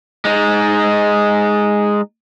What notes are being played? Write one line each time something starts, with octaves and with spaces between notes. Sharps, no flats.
G#3 D#4